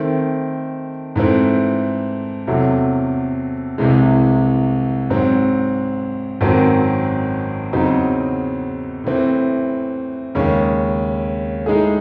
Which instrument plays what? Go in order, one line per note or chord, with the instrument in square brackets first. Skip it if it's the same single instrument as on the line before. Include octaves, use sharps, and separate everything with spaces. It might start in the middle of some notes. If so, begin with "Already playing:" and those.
Already playing: [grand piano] D#3 A3 C4
G#2 E3 A3 C4
E2 C3 F#3 A3
C2 C3 E3 G#3
G#2 F#3 C4
G#1 F#2 D#3 F#3 C4
E2 C#3 F#3 C4 D#4
A2 E3 C4
D#2 C#3 G#3 C#4
A2 G#3 D#4 G#4